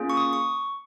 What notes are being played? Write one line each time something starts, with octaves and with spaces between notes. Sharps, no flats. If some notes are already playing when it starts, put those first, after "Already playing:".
Already playing: A#3 C#4 F4 G#4
C#6
D#6
C#6